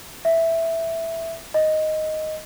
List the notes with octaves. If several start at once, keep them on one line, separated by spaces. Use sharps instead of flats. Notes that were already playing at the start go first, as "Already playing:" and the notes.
E5
D#5